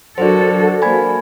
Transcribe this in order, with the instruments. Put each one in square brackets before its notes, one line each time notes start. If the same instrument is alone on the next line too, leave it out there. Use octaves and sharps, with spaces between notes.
[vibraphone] F#3 D4 A#4 [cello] F#4 A4 [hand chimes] C5 D5
[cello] A#3 [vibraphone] C5 D5 [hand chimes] G#5 B5 G#6